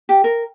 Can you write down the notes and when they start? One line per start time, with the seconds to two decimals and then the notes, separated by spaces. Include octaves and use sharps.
0.09 G4
0.24 A#4